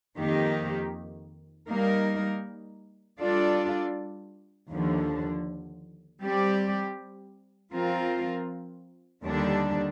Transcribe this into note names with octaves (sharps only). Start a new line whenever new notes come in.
F2 D#3 A#3 D#4 G4
G3 A#3 D#4 A#4
G3 D4 F4 A4 D5
D#2 D3 F3
G3 C4 G4 D5
F3 C4 F4 A#4
D#2 D3 G3 D4